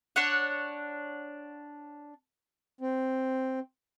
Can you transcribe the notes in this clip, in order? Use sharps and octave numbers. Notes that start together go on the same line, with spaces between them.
D4 C#5 F#5
C4